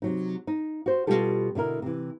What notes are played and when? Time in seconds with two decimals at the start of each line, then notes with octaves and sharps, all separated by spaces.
0.02 C3 F#3 D#4
0.47 D#4
0.86 F#4 C5
1.07 B2 D#3 G3 F4 G4 A4
1.55 B2 D3 E4 A#4
1.82 C3 E3